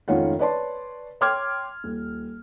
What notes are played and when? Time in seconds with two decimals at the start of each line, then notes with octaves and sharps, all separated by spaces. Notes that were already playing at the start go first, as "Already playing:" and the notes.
0.08 F1 G#2 D#3 C#4 F4 F#5
0.39 B4 C#5 D5 A5 C6
1.21 C#5 G5 C6 D6 F6 G#6
1.84 D#1